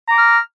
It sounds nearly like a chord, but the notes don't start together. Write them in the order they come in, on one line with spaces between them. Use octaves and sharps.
A#5 D6 F6